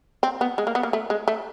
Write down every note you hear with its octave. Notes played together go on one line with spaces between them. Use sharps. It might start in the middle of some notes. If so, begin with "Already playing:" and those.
C4
B3
G#3
A#3
B3
A#3
A3
G#3
A3